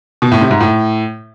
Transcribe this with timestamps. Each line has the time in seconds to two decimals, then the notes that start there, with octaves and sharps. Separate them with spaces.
0.22 B2
0.32 A2
0.41 C3
0.51 G#2
0.61 A2